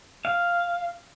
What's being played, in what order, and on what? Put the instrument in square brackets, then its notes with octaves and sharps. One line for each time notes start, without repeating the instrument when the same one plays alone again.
[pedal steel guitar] F5